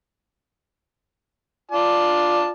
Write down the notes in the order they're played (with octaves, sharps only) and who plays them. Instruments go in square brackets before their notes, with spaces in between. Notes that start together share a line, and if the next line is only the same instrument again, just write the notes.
[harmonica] F4 D5 A5